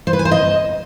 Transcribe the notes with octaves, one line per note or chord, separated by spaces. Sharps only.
C5
B4
G#5
C5
D#5